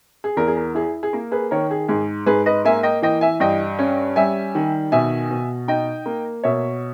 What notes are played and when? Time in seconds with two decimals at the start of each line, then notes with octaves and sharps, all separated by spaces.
0.24 G#4
0.37 E2 A#4
0.47 G#4
0.57 A#4
0.75 E4 G#4
1.03 G#4
1.13 A#3 A#4
1.32 G#4 B4
1.51 D#3 A#4 C#5
1.71 G#4
1.88 G#2 G#4
2.26 G#2 G#4 B4
2.46 B4 D#5
2.65 A#3 E5 G#5
2.83 D#5 G5
3.02 E3 D#5 G5
3.21 E5 G#5
3.40 G2 D#5 G5
3.79 C#4
4.16 G3 E5 G#5
4.55 D#3
4.92 B2 E5 G#5
5.31 B2
5.68 D#4 D#5 G5
6.06 A#3
6.44 B2 C#5 E5